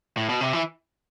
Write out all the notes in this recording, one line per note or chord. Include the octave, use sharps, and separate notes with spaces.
A2
B2
C3
E3